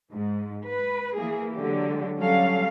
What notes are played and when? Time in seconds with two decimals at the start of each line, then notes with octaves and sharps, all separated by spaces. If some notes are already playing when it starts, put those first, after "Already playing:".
0.12 G#2
0.66 B4
1.17 E3 A#3 G#4
1.57 D3 F#3 G#3 G4
2.17 F#3 G3 C#4 A4 F5